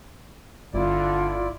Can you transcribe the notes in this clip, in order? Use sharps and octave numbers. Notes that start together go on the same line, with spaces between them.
G1 D3 E4 F4 D5